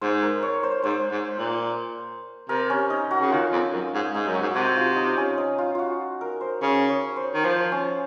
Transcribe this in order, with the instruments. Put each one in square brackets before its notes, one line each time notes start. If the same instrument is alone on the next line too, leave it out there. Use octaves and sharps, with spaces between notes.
[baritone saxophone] G#2 [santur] C5
[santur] A#4
C#5
C5
[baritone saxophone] G#2 [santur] C5
[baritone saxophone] G#2
A#2
[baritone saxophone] C3 [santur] A#4
[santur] C#4
D#4
F#4
[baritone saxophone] C#3
[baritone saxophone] D#3 [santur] F4
[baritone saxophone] F2
F#2
G#2
[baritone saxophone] G#2 [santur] D#4
[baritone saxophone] F#2
[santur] F#4
[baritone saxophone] G#2
[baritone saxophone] C3 [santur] F#4
[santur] F4
D#4
C#4
D#4
F4
F4 F#4
A#4
C5
[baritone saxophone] C#3 [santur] C#5
[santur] C#5
C5
[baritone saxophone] D#3
[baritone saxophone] F3 [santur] C5
[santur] C#4